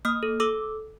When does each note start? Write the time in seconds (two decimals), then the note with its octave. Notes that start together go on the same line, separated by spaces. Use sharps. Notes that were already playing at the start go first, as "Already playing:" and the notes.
0.05 A#3 D#6 F6
0.23 A4
0.40 A4 D6 E6